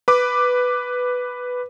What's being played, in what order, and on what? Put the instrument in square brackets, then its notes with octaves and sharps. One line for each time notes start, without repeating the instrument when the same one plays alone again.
[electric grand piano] B4 D6